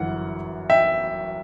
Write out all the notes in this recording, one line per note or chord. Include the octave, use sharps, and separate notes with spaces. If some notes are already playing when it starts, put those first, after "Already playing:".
Already playing: G1 F#2 E3 F#5
E5 G5